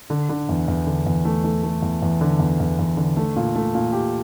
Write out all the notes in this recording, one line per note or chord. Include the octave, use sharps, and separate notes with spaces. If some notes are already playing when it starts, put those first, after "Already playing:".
D3
D3
E2
E2
D3
E2
A3
A3
A3
E2
E2
D3
E2
E2
E2
D3
A3
A#2
A3
A#2
G4